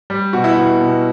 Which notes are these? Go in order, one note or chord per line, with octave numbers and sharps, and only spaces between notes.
G3
B2 F#4
E4
B2 F#4
B2